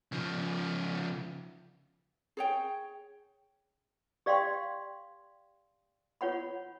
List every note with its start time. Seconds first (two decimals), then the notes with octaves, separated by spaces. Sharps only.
0.12 C#3 F3
2.37 G#4 C#5 G5
4.26 G4 D5 F5 G5 C6
6.21 F4 C#5 F#5 B5